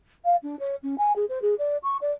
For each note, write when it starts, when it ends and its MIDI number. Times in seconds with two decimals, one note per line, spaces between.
0.25 0.36 77
0.43 0.58 62
0.59 0.76 73
0.83 0.95 61
0.98 1.13 80
1.16 1.25 68
1.29 1.39 72
1.42 1.55 68
1.59 1.77 74
1.83 1.97 85
2.01 2.11 74